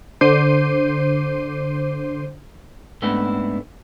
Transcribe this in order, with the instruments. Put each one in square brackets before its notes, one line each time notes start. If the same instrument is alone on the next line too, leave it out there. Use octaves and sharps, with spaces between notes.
[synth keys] D3 C5 D6 G6 C7 D#7
[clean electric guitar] G#2 A3 B3 C4 D4 E4